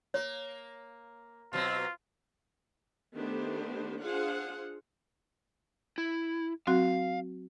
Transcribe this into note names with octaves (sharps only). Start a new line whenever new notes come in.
A#3 C#5
B2 F#3 C4 F4
D#3 A3 B3 D4 G4 C5
D4 F4 G#4 C5 F5 F#5
E4
F#3 C4 F#4 F5